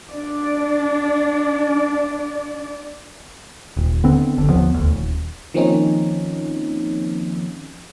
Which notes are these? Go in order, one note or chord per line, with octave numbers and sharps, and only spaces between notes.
D4 D5
D#1
D3 B3 C4
F1 D3
D#2 F3 B3
E1 D2
D#1
D#3 F3 A#3 C4 C#4 D#4